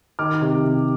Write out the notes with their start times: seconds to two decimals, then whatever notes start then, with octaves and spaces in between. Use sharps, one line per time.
0.19 D#3 D6 F6
0.41 C3
0.64 C3